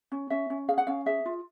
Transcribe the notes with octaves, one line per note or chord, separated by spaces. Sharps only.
C#4
C#4 E5
C#4
G#4 F5
F#5
C#4 F5
G#4 E5
F4